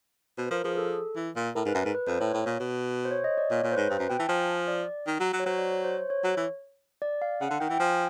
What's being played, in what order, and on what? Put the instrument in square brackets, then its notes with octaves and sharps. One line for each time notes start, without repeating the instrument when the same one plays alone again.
[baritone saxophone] B2 [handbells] C5
[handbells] B4
[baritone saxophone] F3 [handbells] A#4
[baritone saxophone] F3 [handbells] G#4
[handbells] A4
[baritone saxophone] E3
A#2
[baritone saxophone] A2 [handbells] A#4
[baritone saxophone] G#2
[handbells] B4
[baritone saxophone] F#2
G#2
[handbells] B4
[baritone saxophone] F2 [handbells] C5
[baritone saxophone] A2 [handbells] C#5
[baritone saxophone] A2
A#2
B2
[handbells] C5
C#5
D#5
D5
[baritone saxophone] A#2 [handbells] C#5
[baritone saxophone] A#2
[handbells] C5
[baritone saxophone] G#2 [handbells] B4
[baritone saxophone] G2
F#2
[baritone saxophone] B2 [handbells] G5
[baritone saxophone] E3 [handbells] A5
[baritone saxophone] F3 [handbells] G#5
[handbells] D5
[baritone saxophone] D#3
F#3
F#3
[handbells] C#5
[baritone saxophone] F#3 [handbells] C5
[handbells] D5
C#5
C5
C5
C#5
[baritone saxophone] F#3
E3
[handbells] D5
F5
[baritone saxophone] C#3 [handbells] F#5
[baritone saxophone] D3
[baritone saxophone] D#3 [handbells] G5
[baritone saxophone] E3
[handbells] G5
[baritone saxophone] F3 [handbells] G#5